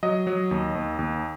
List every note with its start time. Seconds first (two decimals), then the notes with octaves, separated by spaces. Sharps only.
0.03 F#3 D#5
0.27 F#3
0.51 D#2
0.75 D#2
0.99 D#2